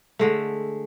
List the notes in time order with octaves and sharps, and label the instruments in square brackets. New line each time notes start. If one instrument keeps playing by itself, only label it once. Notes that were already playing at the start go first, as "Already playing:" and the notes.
[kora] D3 G#3 A3